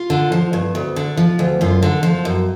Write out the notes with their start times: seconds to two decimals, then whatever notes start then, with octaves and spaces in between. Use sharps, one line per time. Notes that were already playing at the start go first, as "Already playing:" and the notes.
Already playing: F4
0.10 D3
0.32 F3
0.53 G2
0.75 D2
0.96 D3
1.17 F3
1.39 D2
1.61 F#2 F4
1.83 D3
2.03 F3
2.25 F#2